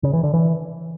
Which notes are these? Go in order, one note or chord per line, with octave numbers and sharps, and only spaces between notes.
C#3
E3
D3
E3